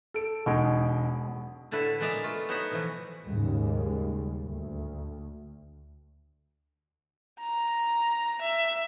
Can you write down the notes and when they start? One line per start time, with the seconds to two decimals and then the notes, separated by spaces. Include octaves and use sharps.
0.14 A4 D7
0.46 E1 B2 G#3 D#4
1.71 A2 D3 E4 A4 B4 E5
2.00 A#2 G#3 B3 D5 E5 A#5
2.24 A3 F4
2.49 B3 D#4 F#4 C#5 E5 F#5
2.71 B2 E3 F3
3.25 D#2 G#2 C#3 G3 G#3
4.46 D2
7.40 A#5
8.41 E5